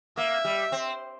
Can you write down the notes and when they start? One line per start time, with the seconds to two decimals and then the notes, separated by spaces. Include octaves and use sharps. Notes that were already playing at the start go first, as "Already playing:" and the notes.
0.17 A#3 E5
0.45 G3
0.72 C4